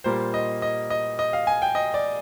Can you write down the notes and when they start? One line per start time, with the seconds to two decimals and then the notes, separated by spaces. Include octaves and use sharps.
0.04 A#2 G3 A#3 C5
0.34 D#5
0.62 D#5
0.90 D#5
1.19 D#5
1.33 F5
1.47 G#5
1.62 G5
1.75 D#5
1.94 D5